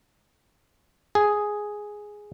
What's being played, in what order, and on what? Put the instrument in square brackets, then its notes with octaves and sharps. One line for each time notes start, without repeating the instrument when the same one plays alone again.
[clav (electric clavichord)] G#4